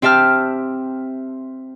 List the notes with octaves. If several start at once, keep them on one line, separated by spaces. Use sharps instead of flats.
C4 G4 E5 A5 F6